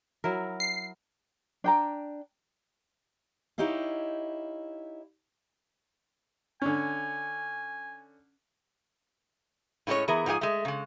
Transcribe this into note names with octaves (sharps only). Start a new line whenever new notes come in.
F#3 E4 A#4
C7
D4 G5 A#5
D#4 E4 G4 C#5 D#5 F5
D3 C#4 G#5
A2 F3 G#3 C#4 C#5
E3 B3 G#4 A#4
G#2 F3 G4 G#4 G#5
G#3 A3
C#3 G#3